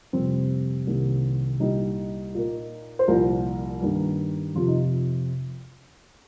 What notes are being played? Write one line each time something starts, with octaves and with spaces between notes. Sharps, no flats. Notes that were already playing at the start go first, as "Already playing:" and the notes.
F2 C3 G3 A#3 C4
C2 C3 D#3 A#3
C2 A#2 G3 D#4
A#2 A#3
C5
C2 A#2 F3 A#4
G2 D#3 G3 A#3
F2 C3 F3 F4
D#4